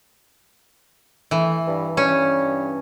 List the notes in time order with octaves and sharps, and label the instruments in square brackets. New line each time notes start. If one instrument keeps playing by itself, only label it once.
[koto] E3 [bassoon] A3
[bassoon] G2
[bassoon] G2 [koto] C#4